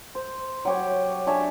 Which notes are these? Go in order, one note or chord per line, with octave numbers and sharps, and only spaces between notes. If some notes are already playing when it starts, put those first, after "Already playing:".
C5
F#3 G4 C#5
D4 C#5 E5 G#5